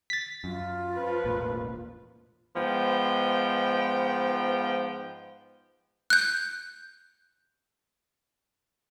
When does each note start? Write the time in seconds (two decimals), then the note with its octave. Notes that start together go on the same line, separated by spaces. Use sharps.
0.10 A6 B6
0.44 F#2 F4
0.94 F3 B4
1.24 E1 A1 A#2
2.55 G#2 F3 B3 G5
6.10 F#6 G6